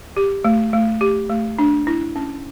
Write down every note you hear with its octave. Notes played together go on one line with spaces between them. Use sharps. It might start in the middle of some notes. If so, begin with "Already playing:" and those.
G4
A3
A3
G4
A3
D4
E4
C#4